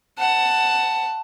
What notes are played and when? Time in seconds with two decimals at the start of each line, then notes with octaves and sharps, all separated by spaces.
0.18 F#5 A5